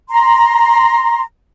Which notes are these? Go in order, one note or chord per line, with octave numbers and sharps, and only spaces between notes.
A#5 C6